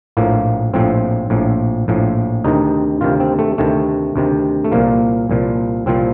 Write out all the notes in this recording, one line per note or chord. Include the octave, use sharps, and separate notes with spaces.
A#1 A2 F3 A#3
A#1 A2 F3 C4
A#1 A2 F3
A#1 A2 F3
D2 C3 D#3 D#4
D2 C3 D#3 F4
C4
A3
D2 C3 D#3 A3
D2 C3 D#3
A3
C2 A#2 F3 A#3
C2 A#2 F3
C2 A#2 F3 C4